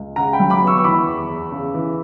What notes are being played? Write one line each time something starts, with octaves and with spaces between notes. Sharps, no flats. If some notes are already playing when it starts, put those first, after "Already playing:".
Already playing: C#2
C#3 F#5 A#5
G5 B5
F#3
B5 D6
B3
C#6 E6
C#6
E3 B5 D6
E2
E2
C#3
E3